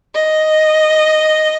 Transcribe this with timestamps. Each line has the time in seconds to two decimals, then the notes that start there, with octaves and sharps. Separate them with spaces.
0.14 D#5